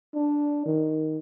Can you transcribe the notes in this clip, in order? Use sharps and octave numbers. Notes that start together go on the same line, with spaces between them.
D4
D#3